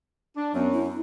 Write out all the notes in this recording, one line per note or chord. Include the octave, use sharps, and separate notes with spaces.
D4
F#2 B3
E4